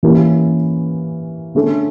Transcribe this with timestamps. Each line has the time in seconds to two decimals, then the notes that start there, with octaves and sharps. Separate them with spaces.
0.03 E3 A#3 C#4 G4
1.55 D3 A3 C#4